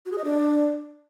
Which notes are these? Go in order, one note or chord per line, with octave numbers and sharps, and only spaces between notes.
F#4
G#4
D#5
D4